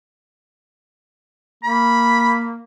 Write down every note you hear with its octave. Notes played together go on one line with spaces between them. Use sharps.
A#3 B5